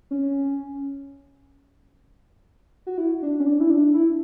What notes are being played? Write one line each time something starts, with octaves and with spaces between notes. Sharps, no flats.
C#4
F#4
E4
D4
C#4
D4
E4
D4
E4